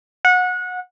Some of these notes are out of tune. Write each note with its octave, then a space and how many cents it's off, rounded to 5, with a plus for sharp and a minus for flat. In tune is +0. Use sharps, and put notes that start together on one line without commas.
F#5 -25